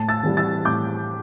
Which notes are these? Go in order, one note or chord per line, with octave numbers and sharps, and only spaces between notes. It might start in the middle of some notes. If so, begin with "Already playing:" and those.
Already playing: A2 A5
E6 A6
E3 G3
E6 A6
A2 D6 G6